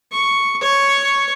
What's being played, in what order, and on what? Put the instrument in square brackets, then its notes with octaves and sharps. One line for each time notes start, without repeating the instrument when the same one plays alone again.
[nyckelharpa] C#6
C#5 C#6